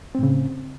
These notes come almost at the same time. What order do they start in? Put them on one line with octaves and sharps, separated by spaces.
C4 A2 C#3